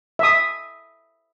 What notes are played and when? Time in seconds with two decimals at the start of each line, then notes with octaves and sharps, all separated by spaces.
0.19 E5 D#6